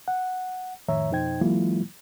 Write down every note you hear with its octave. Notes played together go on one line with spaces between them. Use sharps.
F#5
F2 A2 D#3 C#5 E5 A#5
F2 B2 D#4 C5 G5 G#6
E3 F#3 G#3 A#3 E4 F4